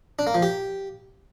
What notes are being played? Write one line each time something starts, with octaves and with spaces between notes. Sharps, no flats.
D4
A#3
F3
G4